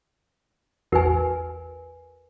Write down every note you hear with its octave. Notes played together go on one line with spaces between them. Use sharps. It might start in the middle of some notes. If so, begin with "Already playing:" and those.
A1 E2 F#4 A#4 B4 G#5